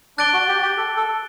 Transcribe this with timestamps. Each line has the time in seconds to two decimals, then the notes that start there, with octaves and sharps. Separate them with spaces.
0.18 D4 F#6 A6 D7 G7
0.33 F#4
0.48 G4
0.62 G4
0.77 A4
0.97 A4